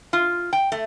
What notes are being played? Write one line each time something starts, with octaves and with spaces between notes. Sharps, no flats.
F4
G5
A3